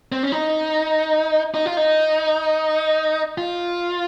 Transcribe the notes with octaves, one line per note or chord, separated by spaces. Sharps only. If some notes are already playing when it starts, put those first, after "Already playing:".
C4
C#4
D#4
D#4
F4
D#4
F4